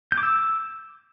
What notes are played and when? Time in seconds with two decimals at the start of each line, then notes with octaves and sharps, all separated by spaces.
0.12 G6
0.18 D6
0.23 E6